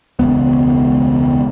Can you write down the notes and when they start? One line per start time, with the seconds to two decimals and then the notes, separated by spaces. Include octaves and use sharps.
0.19 E1 C#2 B3